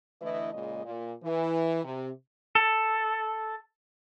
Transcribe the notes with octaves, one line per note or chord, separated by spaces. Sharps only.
D3 E3 A3 E4 B4 D#5
A#2 C#3 G#3 D#5
A#2
E3
C3
A4